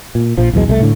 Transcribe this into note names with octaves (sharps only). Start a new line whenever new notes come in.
A#2
A#1 F3
B1 E2 B2 G#3
C2 G#3 A3
A2 D3